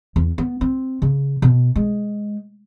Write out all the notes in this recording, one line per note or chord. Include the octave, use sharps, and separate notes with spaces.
E2
B3
C4
C#3
B2
G#3